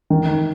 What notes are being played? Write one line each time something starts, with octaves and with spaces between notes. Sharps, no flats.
D#3